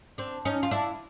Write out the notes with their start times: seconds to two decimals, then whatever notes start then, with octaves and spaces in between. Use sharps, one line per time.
0.18 C4 D4
0.45 C#4 D#4
0.63 F4
0.71 D4 E4